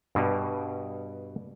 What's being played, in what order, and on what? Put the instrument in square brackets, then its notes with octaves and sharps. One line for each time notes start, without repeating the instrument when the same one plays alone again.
[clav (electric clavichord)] G2 B2